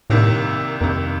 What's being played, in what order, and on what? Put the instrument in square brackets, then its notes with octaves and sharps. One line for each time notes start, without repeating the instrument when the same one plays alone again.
[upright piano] C2 C3 D#3 A#3 [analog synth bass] A2
[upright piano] C2 C3 D#3 A#3 [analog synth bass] F2